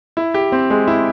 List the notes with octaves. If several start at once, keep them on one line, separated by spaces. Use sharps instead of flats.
E4
G4
C4
G#3
E4